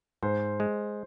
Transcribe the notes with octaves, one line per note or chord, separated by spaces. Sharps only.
G#2 C5
G#3